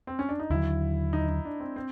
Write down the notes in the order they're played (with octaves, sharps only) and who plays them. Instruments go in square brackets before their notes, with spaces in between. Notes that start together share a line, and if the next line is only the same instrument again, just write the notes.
[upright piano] C4
C#4
D4
D#4
[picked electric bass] D#2 D3 F#3 [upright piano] E4
[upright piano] D#4
D#4
D4
C4
C4